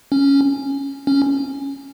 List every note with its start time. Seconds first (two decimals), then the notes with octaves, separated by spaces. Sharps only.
0.12 C#4
1.07 C#4